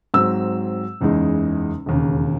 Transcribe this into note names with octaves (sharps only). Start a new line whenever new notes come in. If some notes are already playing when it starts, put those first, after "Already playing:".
G#2 F#3 C4 E6
F#1 E2 C#3 G#3 D#4
E1 D#2 C#3